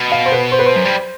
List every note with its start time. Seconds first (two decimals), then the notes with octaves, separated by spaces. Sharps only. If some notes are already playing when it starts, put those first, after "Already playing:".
Already playing: B2
0.12 F5
0.26 C5
0.32 B4
0.52 C5
0.59 B4
0.66 C5
0.76 F#2
0.85 G2